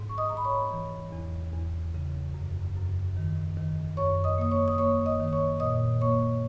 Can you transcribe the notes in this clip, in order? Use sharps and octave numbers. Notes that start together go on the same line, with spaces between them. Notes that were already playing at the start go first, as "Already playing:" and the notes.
Already playing: G#2
C#6
D#5 D#6
G#2 A#5
B5
C#5 C#6
E3
E2
E2
C#3
F#2
F#2
D#3
D#3
F#2 C#5 C#6
D#5 D#6
A#3 D#6
C#5 C#6
D#6
A#3 C#5 C#6
D#5 D#6
D#3
C#5 C#6
A#2 D#5 D#6
A#3 C#5 C#6